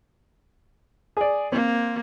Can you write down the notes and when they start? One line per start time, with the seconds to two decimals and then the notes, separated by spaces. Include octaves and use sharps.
1.17 G#4 D5
1.52 A#3 C4